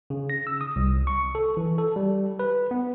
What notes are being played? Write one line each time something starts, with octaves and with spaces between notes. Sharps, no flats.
C#3
A#6
E6
D#6
C2
C#6
A4
E3
A4
G3
B4
B3